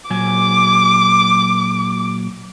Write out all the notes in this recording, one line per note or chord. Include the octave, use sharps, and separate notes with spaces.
A#2 F#3 G#5 D6